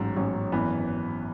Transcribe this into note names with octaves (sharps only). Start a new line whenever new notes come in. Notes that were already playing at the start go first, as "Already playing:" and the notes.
Already playing: A1 G#2 F#3 C#4
A1 G#2 F#3 C#4
G#1 F#2 E3 B3